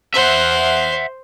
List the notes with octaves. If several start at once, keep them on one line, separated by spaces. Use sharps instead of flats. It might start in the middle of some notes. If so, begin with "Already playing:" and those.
C5 E5 F#5